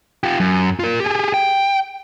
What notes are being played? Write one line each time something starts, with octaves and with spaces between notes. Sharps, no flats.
F4 G4
F#2
F4 A#4
G4 G#4
G5